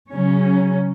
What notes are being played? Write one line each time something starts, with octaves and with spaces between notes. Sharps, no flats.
C#3 F#3 C#4